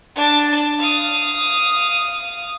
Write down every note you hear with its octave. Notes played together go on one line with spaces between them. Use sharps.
D4 A5
F5 D#6